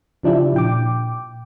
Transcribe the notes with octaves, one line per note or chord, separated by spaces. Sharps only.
C#3 F3 D4 E4 G4
A#2 G5 D6